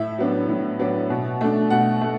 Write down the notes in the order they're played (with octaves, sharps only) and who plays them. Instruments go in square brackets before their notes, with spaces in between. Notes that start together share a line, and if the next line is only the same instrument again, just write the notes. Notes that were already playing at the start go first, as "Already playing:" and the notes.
Already playing: [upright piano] A2 E5
F#3 B3 D4
A2
F#3 B3 D4
B2
A3 D4
B2 F#5
A3